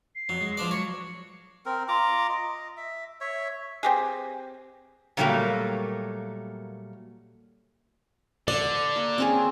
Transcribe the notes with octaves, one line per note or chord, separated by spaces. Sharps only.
C7
F2 F#3
G#3
F3 D4 D5
F#3 C#5 C#6
C4 A#4
F4 A#5 D6
D#5
E5
C#5 E5
C4 G4 G#4
A#2 D3 F#3 G3 A3 A#3
D3 D5
A#3
C4 C#4 G#4